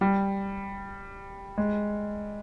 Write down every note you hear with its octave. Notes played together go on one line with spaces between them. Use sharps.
G3
G#3